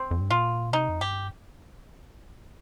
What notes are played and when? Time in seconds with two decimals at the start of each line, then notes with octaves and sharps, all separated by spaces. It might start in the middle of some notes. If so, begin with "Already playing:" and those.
Already playing: C4
0.11 F2
0.21 G2
0.30 A#2 F4
0.72 C3 D#4
0.89 F2
1.01 G2 G4